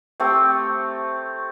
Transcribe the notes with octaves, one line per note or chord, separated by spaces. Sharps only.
A3 C4 G4